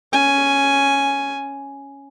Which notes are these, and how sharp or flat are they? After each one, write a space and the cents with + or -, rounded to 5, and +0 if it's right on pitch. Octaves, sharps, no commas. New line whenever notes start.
C#4 +0 G#5 +5